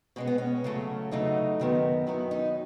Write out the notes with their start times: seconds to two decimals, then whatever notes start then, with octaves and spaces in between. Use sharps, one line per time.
0.16 B2 G#3 B3 C#4
0.27 B3
0.38 C#4
0.64 E2 C#3 F#3 A3
1.11 E2 C#3 F#3 A3 D#4
1.59 F#2 D#3 F#3 B3
2.06 F#2 D#3 F#3 B3 E4
2.31 D#4